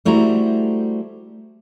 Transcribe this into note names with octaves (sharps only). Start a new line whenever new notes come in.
G3 A3 E4 F#4 C5 A#5